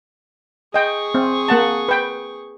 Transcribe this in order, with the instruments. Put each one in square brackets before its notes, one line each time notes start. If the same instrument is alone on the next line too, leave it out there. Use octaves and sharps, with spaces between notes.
[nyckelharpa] G#4 C#6 [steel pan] D#5 G5
[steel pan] C4
A#3 F#5 A5
B4 G5